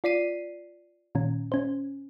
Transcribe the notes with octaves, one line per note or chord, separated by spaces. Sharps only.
F4 D5 B6 C7 D#7
A#2 D#3 C#4
C#4 C5